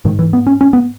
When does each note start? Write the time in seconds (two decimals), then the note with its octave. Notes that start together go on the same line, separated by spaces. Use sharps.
0.05 G#2 D#3
0.19 E3
0.33 B3
0.47 C#4
0.61 C#4
0.73 B3